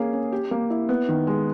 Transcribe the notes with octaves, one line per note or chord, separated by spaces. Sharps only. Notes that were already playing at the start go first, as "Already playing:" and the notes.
Already playing: A#3 C#4 G#4
C#4
G4
A#3
E4
B3
D#3
G#3